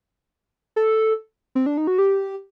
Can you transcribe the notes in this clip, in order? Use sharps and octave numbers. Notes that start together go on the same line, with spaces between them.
A4
C4
D4
D#4
F#4
G4